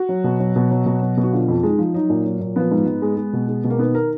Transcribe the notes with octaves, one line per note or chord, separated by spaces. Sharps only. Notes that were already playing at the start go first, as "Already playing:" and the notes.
Already playing: F#4
F#3
B2
F#3
B2
F#3
B2
F#3
B2
F#4
D3 F4
F2
G#3 D#4
F3
F#3 D#4
A#2
F#3
A#2
F3 B3
G#2
G#2
G#3
G#3
B2
G#3
B2
A#3
D#3 B3
A#4